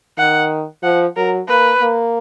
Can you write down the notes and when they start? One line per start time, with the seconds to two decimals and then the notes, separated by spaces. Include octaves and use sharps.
0.18 D#3 F#5
0.83 F3 F#5
1.16 F#3 A#4
1.49 A#3 B4
1.81 A#3